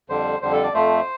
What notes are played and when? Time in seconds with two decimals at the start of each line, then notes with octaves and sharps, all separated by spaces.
0.09 F2 D3 G3 C5
0.42 F2 D3 G3 C5
0.53 A4
0.63 D5
0.74 F2 F3 A3 C5